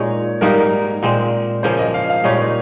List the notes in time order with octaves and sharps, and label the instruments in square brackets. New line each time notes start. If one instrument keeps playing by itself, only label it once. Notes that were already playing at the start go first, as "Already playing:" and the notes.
Already playing: [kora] A#2 G#3 D#4 [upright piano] C#5
[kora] G#2 G3 A#3 D#4 [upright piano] A#4
[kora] A#2 G#3 C4
[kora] C#3 F3 A#3 C#4 [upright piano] C5
[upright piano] D#5
F5
F5
[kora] A#2 G#3 D#4 G4 [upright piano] C#5